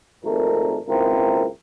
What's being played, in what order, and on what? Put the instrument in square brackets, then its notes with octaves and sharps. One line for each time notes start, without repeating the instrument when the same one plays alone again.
[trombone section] G#1 F2 A#2 A3 A#4
G#1 C#2 A#3 C4 E4 A#4